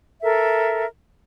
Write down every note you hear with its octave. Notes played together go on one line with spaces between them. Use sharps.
A4 A#4 E5